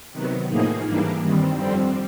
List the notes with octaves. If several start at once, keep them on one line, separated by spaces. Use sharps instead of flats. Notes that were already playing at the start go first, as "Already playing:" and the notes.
C3 D#3 F#3 B3
A2 F3 A#3 D#4 G#4
G#2 E3 G3 A#3 D4
G2 D#3 G3 C4
F2 D3 G3 C4